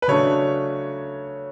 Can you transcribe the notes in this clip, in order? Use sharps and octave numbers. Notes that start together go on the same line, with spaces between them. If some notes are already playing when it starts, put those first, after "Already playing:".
B4
C#3 F#3 A3 D4 C#5